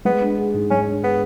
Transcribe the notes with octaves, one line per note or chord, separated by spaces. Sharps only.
G#3 B3
D4
G#4
G#2
G#3 C#4
D4
B3 G#4